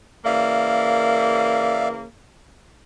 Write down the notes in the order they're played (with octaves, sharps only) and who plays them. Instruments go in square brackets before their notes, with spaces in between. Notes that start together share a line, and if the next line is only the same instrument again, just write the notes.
[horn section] C#3 E3 A#3 [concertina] D5 E5 F5